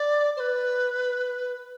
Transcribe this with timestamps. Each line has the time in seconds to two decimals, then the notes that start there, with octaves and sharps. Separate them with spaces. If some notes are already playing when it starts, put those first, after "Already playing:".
Already playing: D5
0.37 C5
0.40 B4